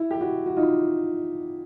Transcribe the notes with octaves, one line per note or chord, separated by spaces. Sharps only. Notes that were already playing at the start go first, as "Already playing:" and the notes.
Already playing: E4
G4
E4 F#4
F#4
D#4 F4